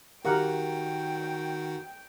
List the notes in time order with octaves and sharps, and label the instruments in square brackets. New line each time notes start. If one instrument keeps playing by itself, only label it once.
[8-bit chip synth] D#3 F#4 [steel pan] G4 A#4 F#5 [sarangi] G5